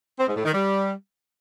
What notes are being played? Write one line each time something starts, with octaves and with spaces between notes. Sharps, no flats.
C4
G#2
A2
D#3
G3